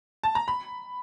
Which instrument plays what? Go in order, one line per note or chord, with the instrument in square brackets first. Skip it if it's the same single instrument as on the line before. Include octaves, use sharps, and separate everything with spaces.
[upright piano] A5
A#5
B5